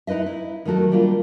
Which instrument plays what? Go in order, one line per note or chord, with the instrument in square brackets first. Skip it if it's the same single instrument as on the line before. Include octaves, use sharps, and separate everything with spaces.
[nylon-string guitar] D#4 E4 B4 D#5 E5
E4
D#3 F#3 A3 F#4 A#4
G3 A#3 D4 F4